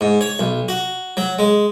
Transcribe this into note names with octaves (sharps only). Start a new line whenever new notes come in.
G#2
C#5
B1
F#4
F#3
G#3